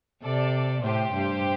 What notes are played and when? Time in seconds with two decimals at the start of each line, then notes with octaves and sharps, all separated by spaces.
0.22 C3 A4 D5
0.82 A2 G4 C5
1.13 G2